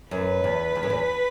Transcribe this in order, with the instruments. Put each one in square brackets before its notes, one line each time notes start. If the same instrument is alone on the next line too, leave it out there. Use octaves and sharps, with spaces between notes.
[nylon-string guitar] F#2 [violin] B4
[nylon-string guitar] E2
E2
F#2
E2